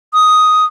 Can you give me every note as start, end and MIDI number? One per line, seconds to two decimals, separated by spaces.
0.14 0.65 87